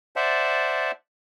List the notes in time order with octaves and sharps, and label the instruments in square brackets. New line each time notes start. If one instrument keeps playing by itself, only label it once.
[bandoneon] C5 D5 E5 F#5 A5